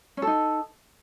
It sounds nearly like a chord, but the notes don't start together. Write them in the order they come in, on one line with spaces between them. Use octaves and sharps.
C#4 A4 D#4